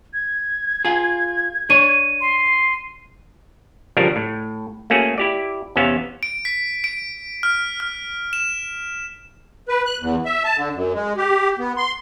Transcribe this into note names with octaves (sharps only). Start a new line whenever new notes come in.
G#6
F4 G#4
D4 C#5 D#7
C6
C#3 F3 G3 D4 A#4
A2
A3 A#3 C#4 F#4 G#4
E4 G4 D5
E2 C3 B3 C#4 E5 F5
D7
B6
D7
F6
F6
E7
B4
F#6
E2
E5
A5
D3
F#2
G#3
G4
B3
C6